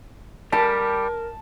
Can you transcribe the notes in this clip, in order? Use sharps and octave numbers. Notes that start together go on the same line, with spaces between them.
G3 G4 A#4 A5